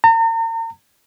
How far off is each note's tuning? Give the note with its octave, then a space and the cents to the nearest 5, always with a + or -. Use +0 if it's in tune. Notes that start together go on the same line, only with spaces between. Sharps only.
A#5 -40